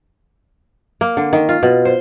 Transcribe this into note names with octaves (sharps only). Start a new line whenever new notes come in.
A#3
D3
D#3
F4
B2
C5